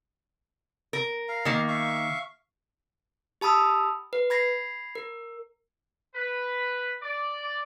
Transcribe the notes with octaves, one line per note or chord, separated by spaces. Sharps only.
A#4
F5 A#5
D#3 A#3
E5 F5 C#6
G4 A5 B5 D#6 E6
B4
B5 G#6 A#6 C7
A#4
B4
D5